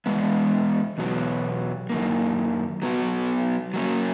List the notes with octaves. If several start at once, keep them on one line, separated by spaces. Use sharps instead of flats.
E2 C#3 G#3 B3
E2 B2 F#3 B3
F#2 D#3 A#3
F#3 B3 F#4
F#3 A#3 C#4